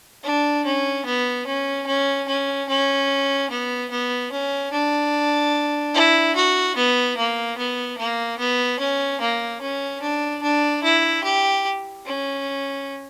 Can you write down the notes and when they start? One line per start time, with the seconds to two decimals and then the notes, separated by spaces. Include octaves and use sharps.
0.24 D4
0.65 C#4
1.06 B3
1.47 C#4
1.87 C#4
2.28 C#4
2.69 C#4
3.50 B3
3.91 B3
4.32 C#4
4.72 D4
5.95 E4
6.36 F#4
6.76 B3
7.17 A#3
7.57 B3
7.98 A#3
8.39 B3
8.80 C#4
9.21 A#3
9.61 C#4
10.02 D4
10.43 D4
10.83 E4
11.24 G4
12.06 C#4